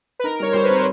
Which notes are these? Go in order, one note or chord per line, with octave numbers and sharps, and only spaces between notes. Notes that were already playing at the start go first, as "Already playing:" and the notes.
B4
D#4 A#4
G3 C#5
G3 C5
B4
C4 A#4